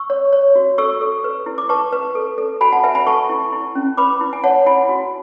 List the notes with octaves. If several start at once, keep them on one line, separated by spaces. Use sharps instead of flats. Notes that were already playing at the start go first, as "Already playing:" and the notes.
Already playing: C#6 E6
C#5
C#5
F#4
A4 C#6 E6
A4
B4
E4
D6
B4 A5 C#6
B4
A4
A4
F#4 G#5 B5
F#5 A5
B4 E5 G#5
G#5 B5
A4 A5 C#6
E4
E4
C#4
B4 B5 D6
E4
G#5
C#5 F#5 A5
E4 G#5 B5
F#4